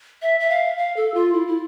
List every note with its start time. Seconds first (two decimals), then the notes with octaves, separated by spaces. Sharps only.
0.22 E5
0.40 E5
0.49 F5
0.78 F5
0.96 A4
1.14 F4
1.33 E4
1.47 E4